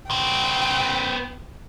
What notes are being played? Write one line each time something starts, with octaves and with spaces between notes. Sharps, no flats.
B3 C5 G5